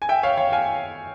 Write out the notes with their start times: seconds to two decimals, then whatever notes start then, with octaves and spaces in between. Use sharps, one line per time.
0.02 G#5
0.09 E5 G5
0.23 C#5 F5
0.37 C#5 F5
0.52 F5 G#5